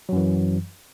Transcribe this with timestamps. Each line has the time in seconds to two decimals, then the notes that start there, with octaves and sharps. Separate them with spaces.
0.09 F#3
0.12 F#2
0.16 E3